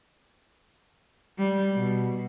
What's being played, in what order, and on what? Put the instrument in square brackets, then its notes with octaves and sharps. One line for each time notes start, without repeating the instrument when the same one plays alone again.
[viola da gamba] G3
B2